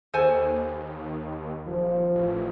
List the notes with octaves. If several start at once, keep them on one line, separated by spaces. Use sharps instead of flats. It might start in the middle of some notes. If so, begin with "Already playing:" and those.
D#2 A4 C5 G#5
D#1 F3
A1